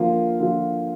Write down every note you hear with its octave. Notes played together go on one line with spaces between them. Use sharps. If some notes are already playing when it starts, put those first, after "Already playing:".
Already playing: D3 F3 A#3 F4
D3 F3 A#3 F4